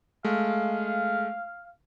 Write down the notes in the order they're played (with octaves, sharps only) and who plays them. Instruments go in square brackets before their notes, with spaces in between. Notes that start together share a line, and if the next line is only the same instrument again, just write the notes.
[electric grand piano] G#3 A3 [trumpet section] F5